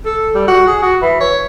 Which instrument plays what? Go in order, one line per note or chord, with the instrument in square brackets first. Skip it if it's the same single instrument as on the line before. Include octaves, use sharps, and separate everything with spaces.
[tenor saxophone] A4
G3
F#4
G#4
F#4
E3
C#5